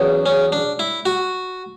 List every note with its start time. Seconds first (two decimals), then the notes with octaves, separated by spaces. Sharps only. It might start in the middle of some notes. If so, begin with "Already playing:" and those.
Already playing: E2 C#3 F#3 B3
0.26 C#4
0.52 D4
0.79 E4
1.05 F#4